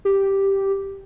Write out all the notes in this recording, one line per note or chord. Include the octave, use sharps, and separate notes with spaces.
G4